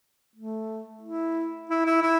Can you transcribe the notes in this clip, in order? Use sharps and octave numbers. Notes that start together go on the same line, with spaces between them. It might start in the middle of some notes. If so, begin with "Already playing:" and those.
A3
E4
E4
E4
E4